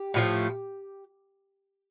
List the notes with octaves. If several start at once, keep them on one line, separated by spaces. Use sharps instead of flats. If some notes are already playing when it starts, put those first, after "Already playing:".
Already playing: G4
A2 F3 A3